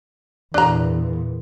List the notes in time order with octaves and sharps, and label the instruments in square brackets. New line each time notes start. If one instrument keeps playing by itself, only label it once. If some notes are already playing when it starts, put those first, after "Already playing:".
[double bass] E2 A#2 [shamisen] D4 A#5